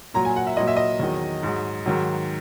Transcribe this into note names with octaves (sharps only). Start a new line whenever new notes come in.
A#2 F#3 A#5
G#5
F#5
E5
A#2 F#3 D#5
E5
D#5
E2 D#3 F#3
G#2 F#3
G#2 D#3 F#3